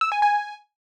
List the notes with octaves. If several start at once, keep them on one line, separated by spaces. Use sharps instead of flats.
E6
G#5
G#5